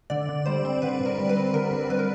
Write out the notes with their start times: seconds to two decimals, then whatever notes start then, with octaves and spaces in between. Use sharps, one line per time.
0.10 D3 D5
0.29 D3
0.46 G3 C5
0.65 C4
0.82 D3 B4
1.00 D3
1.06 A#4
1.18 G3
1.29 B4
1.37 C4
1.54 D3 A#4
1.71 D3
1.90 G3 B4
1.99 A#4